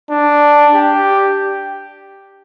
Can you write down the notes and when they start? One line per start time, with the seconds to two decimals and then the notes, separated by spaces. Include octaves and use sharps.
0.10 D4
0.75 G4